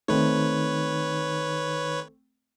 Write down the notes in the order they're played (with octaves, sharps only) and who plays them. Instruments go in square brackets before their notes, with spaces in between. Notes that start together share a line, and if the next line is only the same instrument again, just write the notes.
[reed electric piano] D#3 D#4 [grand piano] A3 C4 [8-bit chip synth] B4 C#5